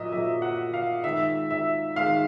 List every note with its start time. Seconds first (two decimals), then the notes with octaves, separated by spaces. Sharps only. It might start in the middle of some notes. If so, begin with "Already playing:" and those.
Already playing: A#2 F#3 D#5 E5
0.12 A#2 F#3 A#3 E5
0.42 F#5
0.74 F5
1.04 D#3 G#3 E5
1.51 E5
1.96 D#3 G#3 F5